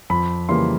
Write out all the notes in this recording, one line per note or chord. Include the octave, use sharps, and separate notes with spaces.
F2 B5
C#3 E3 G3 A#3 C6